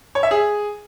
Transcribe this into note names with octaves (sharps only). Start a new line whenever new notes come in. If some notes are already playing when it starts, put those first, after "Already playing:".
C#5
E5
G#4